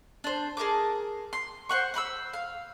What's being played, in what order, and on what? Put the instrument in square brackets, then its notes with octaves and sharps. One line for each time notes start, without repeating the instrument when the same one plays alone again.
[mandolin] D4 C5
G#4 A#4 A5 D6
C6
C5 F#5 C#6
C5 B5 C#6 E6
F5